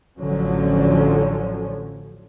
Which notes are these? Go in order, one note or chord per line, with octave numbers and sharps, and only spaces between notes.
A1 D3 F3 F#3 C#4